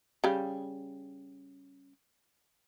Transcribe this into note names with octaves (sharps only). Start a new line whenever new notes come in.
C#3 G3